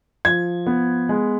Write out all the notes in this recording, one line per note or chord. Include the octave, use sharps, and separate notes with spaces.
F3 G#6
B3
G#3